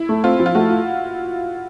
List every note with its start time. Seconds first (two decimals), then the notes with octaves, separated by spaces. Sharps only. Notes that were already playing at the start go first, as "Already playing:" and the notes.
Already playing: E4
0.09 A3
0.24 C4 F4
0.40 F3
0.46 F4
0.55 A3 F#4
0.70 F4